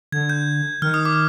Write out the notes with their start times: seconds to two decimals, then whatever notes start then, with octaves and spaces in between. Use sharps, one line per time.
0.12 D3 G#6
0.29 G6
0.82 D#3 F6
0.94 D#6
1.05 D6